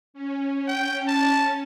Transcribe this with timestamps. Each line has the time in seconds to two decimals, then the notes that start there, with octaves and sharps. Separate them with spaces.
0.14 C#4
0.68 G5
1.08 A5